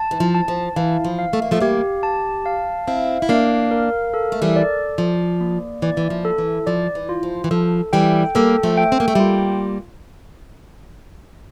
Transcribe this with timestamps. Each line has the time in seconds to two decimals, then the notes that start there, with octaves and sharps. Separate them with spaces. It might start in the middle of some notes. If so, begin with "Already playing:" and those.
Already playing: A5
0.11 E3
0.20 F3
0.35 A5
0.48 F3
0.76 E3 F5
1.05 F3
1.19 F5
1.33 A3
1.42 A#3
1.51 F3 A3
1.60 G3 A#3 G4
2.03 A5
2.46 F5
2.88 C4 E4 F5
3.22 E4
3.29 A#3 D4 F5
3.71 A#4
4.14 A4
4.32 A3
4.42 E3 G3
4.56 D5
4.98 F3 D5
5.41 A#3
5.82 E3 D5
5.97 E3
6.10 F3
6.25 A4
6.38 E3
6.67 F3 D5
6.95 E3
7.09 F4
7.23 F3
7.44 E3
7.51 F3 A4
7.93 E3 G3 G5
8.35 G3 A#3 A4
8.63 F3 A3
8.78 G5
8.92 C4
9.00 A#3
9.08 A3
9.15 G3 A#3 F4